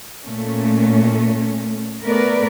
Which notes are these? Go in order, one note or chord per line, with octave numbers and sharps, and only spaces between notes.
A#2 A3 C#4
A3 B3 A#4 B4 D5